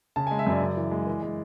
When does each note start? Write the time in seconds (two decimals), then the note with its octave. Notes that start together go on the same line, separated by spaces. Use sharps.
0.16 C#3 A5
0.27 G#3 G#5
0.39 E5
0.47 F#2 D5
0.62 C#3
0.77 E3
0.91 G#3
1.07 E3
1.22 G#3